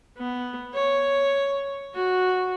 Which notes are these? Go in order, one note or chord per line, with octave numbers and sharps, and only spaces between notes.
B3
C#5
F#4